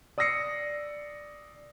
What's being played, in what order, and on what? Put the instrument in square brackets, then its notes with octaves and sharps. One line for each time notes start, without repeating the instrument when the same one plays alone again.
[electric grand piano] D5 D#6 E6 A#6 C7 C#7